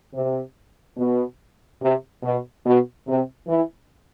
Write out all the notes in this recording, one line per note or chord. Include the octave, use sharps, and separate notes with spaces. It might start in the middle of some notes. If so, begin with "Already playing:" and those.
C3
B2
C3
B2
B2
C3
E3